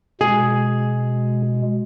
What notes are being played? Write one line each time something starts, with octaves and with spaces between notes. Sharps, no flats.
B2 G#3 G#4